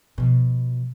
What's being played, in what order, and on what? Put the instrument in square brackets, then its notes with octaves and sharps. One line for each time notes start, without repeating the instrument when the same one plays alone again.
[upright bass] B2 F3